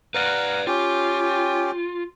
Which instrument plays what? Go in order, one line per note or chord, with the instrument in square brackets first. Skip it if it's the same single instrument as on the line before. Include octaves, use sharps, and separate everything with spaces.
[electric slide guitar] B4 D5 [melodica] F5 F#5 A#5
[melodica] C#4 G4 G5 [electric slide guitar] F4